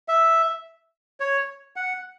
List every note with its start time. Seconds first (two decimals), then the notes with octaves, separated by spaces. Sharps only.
0.08 E5
1.20 C#5
1.76 F#5